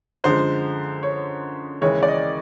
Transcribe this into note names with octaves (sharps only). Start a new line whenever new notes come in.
F#2 D3 F3 G#3 C5
C#5
D#2 C#3 E3 G#3 C#4 C#5
D5
D#5